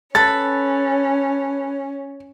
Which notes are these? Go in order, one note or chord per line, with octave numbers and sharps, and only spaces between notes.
C#4 A4 B4 B5 A6